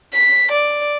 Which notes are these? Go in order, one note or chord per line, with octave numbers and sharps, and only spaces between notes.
B6
D5